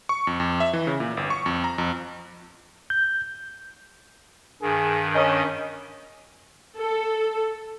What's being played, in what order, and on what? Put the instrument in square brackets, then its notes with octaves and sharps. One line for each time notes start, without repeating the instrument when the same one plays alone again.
[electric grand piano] C#6
F2
F2
E5
E3
C#3
A#2
G1
C#6
F2
A#5
F2
[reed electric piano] G6
[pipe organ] G2 D#3 [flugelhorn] G#4
[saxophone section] C#4 D#5 [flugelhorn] A#4
[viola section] A4